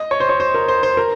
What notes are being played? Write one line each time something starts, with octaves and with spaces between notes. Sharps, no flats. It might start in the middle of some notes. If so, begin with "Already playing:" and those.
Already playing: D#5
C#5
C5
C#5
C5
A#4
C5
C5
A#4